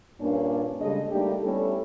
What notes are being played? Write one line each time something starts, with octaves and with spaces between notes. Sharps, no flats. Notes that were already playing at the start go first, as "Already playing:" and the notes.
G2 A#2 A#3 C#4 D4
C#3 G3 G#3 A4 D#5
G3 A3 A#3 D4 D#4 G4
G3 A3 B3 C#4 E4 A4